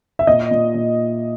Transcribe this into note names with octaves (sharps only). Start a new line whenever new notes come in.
E5
A#2 D#5
A#2
A#2